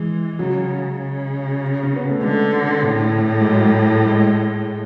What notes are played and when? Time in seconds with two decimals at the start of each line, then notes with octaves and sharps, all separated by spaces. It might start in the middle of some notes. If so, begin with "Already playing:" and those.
Already playing: E3 G#3
0.39 C#3 F#3
1.01 C#3
1.83 C#4
1.96 B3
2.09 A3
2.23 D3 G#3
2.85 A2
3.41 G#3
3.47 F#3
4.03 A3
4.07 G#3